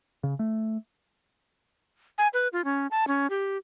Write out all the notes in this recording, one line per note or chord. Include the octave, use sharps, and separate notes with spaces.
C#3
A3
G#5
B4
F4
C#4
A5
C#4
G4